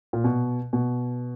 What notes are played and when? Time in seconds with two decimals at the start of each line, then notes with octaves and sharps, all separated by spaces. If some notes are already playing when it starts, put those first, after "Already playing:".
0.13 A#2
0.24 B2
0.73 B2